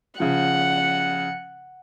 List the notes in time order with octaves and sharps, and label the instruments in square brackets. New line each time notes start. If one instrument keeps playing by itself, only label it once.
[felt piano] C#3 F3 [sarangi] F#5